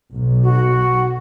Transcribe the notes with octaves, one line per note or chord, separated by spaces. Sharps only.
B1
F#4